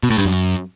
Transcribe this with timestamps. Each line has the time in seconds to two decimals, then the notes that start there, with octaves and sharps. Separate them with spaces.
0.03 B2
0.10 A2
0.18 G2
0.25 F#2